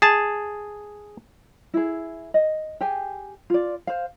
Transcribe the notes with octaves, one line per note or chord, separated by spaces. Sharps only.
G#4 A5
E4 G#4
D#5
G4 G#4 G5 G#5
F4 D5
C5 F5